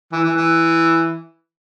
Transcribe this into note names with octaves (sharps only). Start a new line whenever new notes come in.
E3
E3
E3